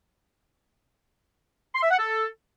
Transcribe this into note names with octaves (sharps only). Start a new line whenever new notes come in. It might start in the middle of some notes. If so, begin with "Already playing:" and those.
C6
E5
F#5
A4